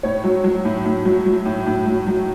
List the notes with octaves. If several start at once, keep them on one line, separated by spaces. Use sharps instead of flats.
A2 C#5
F#3
F#3
A2
A2
F#3
F#3
A2
A2
F#3
F#3